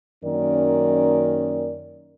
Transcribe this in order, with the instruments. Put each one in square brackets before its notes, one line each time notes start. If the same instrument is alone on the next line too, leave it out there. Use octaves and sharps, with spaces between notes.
[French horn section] F#2 D#3 A#3 C#4 A#4 D5